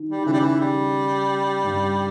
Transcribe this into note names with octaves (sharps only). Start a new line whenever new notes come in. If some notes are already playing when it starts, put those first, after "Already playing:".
Already playing: D#3
G3
D#3
C#3 E3
G3
E3
G3
G2